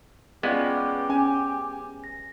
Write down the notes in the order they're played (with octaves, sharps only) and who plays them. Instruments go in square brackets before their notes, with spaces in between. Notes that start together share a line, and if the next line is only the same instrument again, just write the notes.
[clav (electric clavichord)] G#3 B3 [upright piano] C#4 F4 D5 [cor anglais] G4 [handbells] B4 F#5
[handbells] C#4 [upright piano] G#5
[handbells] A#6